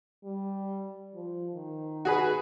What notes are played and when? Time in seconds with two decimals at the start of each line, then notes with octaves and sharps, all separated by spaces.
0.24 G3
1.15 F3
1.55 D#3
2.05 F#4 G#4 B4